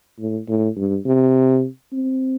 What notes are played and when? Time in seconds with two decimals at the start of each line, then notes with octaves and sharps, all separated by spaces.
0.19 A2
0.48 A2
0.77 G2
1.06 C3
1.93 C4